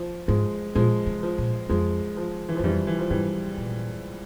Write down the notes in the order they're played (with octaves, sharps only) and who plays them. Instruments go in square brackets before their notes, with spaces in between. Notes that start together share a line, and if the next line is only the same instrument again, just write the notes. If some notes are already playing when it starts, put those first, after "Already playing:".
Already playing: [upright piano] F3
[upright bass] G#2 [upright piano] F3 G#3
[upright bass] A#2 [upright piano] F3 G#3
[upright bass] C3
[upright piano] F3
[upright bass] A#2
[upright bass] F2 [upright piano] F3 G#3
[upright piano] F3
E3
F3
[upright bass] G2
[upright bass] F2 [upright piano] E3 G3
[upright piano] E3
F3
[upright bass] G#2 [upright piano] E3 G3
[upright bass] A#2